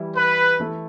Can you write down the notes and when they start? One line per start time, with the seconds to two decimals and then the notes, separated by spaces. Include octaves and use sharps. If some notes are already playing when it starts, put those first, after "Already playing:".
Already playing: E3 G3 E4
0.16 B4
0.60 E3 A3 E4